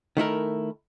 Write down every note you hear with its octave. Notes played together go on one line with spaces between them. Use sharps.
D#3 A3 E4 A#4